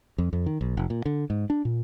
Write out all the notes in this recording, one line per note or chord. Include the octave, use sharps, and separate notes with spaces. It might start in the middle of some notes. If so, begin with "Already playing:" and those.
F2
F2
D#3
B1
F1
A#2
D3
G#2
D4
A#2